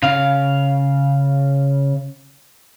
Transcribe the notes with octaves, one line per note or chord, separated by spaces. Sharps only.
C#3 F5